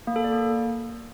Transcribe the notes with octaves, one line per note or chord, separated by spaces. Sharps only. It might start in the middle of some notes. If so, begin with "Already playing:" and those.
A#3
A4
D5
A#3